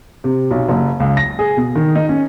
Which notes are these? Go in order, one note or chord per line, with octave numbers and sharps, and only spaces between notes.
C3
B1
F#1
C#2
A#6
G#4
B2
D#3
D#4
C#4